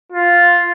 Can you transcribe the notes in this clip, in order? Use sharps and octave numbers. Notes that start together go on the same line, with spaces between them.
F4